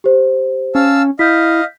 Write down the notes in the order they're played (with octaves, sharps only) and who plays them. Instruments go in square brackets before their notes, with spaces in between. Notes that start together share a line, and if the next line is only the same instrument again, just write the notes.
[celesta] G4 C5
[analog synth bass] C#4 [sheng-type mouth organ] F5 A5 E6
[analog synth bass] E4 [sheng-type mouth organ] D#5 F5 [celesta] G6 B6